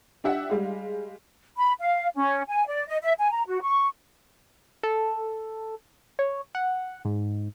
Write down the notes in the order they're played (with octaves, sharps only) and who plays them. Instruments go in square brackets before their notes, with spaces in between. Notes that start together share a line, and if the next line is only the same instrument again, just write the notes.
[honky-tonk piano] D4 G4 E5 F#5
G3 G#3 F5
[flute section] B5
F5
C#4
G#5
D5
D#5
E5
G#5
A#5
F#4
C#6
[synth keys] A4
C#5
F#5
G#2